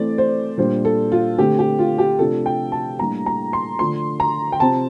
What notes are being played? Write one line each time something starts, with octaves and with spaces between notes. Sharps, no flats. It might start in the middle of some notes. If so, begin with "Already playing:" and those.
Already playing: E3 A3 C4 D5
C5
A#2 G3 D4 C5
A4
F4
D3 A3 C4 G4
G4
F4
G4
C3 F3 A3 D4 A4
G5
A5
A2 G3 A#3 D4 A#5
A#5
C6
D3 F3 A3 D4 C6
A#5
G5
C3 F3 C4 A5